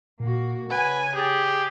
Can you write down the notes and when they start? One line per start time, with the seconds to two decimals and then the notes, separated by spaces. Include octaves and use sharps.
0.20 A#2 A#3 F#4
0.71 C#3 B4 F#5 G#5
1.15 G4 G#4 G6 A6